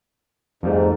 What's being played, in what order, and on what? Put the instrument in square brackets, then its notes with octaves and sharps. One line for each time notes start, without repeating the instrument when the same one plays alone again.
[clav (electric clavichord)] F2 G3 A3 [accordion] G#2